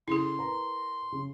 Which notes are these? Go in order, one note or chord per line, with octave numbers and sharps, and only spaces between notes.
C#3 E4 G#4 A4 C6
A#4 B4 A#5
C#3